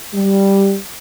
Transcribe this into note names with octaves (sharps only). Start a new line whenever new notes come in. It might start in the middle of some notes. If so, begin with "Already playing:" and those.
G3